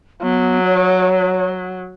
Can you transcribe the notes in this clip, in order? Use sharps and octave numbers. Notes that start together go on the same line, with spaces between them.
F#3 B3
C#5